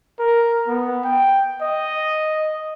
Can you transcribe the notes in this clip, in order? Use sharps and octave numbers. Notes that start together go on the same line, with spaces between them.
A#4
B3
G5
D#5